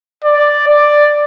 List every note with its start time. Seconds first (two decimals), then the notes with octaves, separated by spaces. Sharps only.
0.24 D5
0.68 D5